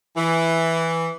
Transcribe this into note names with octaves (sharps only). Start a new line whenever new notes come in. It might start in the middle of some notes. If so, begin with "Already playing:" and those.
E3